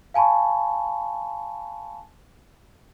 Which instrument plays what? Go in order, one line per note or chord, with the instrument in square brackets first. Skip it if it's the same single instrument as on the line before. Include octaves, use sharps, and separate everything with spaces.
[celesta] F5 G#5 A5 B5 C#6